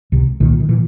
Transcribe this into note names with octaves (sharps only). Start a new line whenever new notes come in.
C#2 C3
C2 A#2 D#3
D#3
A#2 E3